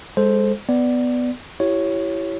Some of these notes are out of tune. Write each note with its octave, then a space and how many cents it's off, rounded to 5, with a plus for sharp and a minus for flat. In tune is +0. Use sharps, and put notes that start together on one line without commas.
G#3 -30 A4 -15 C5 +0
B3 +15 D5 +0
E4 +15 G4 -20 C#5 +0